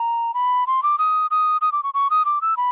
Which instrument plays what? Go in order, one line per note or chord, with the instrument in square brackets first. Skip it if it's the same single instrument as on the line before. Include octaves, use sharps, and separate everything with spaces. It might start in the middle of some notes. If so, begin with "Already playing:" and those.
Already playing: [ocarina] A#5
B5
C6
D6
D#6
D#6
D#6
D6
C#6
C#6
D#6
D6
E6
B5